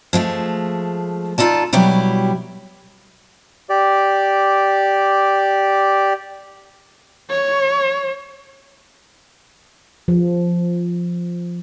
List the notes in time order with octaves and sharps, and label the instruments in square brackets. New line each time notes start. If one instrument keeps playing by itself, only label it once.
[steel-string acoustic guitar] F3 G#3 A3
D#4 F4 A4 D5 A5
B2 F#3 G3 E4 G4
[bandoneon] G4 D5
[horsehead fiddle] C#5
[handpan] F3